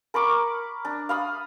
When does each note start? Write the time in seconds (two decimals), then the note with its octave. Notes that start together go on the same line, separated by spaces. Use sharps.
0.14 A#4 B5 C#6 D6
0.85 D4
1.09 F5 B5 D#6